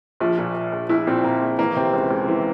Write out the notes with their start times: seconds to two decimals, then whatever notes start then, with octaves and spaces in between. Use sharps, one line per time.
0.20 A#1 F3
0.38 A#2
0.55 A#2
0.72 A#1
0.89 A#1 E4
1.07 A#2 C4
1.24 A#2 A#3
1.42 A#1
1.59 E3 A#3
1.76 C3 C4
1.94 C#2
2.11 C#2
2.28 E3